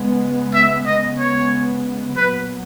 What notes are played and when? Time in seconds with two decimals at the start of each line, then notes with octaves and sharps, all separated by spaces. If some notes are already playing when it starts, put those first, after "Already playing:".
Already playing: C#3 G#3 B3
0.54 E5
0.86 C#3 G#3 B3 D#5
1.18 C#5
2.15 A#2 F#3 B3 B4